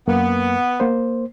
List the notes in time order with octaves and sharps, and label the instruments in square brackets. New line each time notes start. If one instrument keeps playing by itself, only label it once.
[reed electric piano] F#2 A#3 [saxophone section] B3
[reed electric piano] A#3 C5